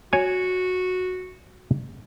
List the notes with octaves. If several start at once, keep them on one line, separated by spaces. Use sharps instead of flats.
F#4 C#5 G#5